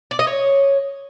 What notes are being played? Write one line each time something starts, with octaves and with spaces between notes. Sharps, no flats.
D5
D#5
C#5